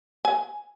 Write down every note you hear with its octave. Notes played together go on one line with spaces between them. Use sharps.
G#5